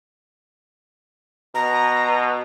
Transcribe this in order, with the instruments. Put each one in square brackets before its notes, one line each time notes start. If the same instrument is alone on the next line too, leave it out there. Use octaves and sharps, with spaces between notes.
[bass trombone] B2 [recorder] A#5